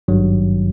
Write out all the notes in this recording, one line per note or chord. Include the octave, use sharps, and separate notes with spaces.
G#1 G2 D#3 F#3